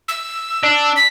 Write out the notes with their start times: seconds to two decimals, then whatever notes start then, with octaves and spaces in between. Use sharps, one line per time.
0.08 E6
0.63 D4
0.96 B6